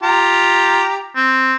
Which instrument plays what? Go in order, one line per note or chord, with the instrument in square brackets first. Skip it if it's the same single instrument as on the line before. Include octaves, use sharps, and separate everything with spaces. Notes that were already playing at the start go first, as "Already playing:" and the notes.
[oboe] F4 [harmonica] G4 A#5
[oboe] C4